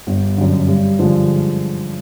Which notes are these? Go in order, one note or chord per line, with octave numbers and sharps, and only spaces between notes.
G1
F#2 D3
G2
D3 F3 G#3